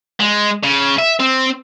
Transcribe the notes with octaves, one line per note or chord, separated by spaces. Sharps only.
G#3
C#3
E5
C4